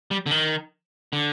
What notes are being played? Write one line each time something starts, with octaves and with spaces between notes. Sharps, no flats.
G3
D3
D#3
D3